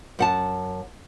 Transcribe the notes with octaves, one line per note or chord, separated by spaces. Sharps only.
F#2 F#5 A5